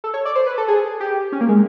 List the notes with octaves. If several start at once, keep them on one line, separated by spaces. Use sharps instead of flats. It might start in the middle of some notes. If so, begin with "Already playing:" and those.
A4
C#5
D5
C5
B4
A4
G#4
G4
C#4
A#3
G#3